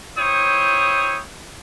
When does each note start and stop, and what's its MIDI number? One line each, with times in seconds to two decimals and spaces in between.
0.18 1.20 64
0.18 1.20 72
0.18 1.20 73
0.18 1.20 79
0.18 1.20 87